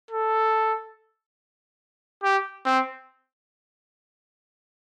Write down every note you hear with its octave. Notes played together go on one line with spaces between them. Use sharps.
A4
G4
C4